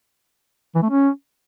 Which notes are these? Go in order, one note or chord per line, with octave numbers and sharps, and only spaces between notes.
E3
A3
C#4